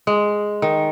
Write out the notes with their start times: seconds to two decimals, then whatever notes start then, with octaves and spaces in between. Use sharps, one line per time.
0.07 G#3
0.62 D#3